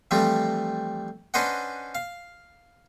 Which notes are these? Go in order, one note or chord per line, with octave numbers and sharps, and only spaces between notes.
E3 F3 G3 A3 C4
C#4 D4 B4 C5 D#5 F#5
F5